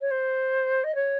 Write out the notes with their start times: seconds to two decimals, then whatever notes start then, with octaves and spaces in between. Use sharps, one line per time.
0.01 C#5
0.11 C5
0.84 D#5
0.95 C#5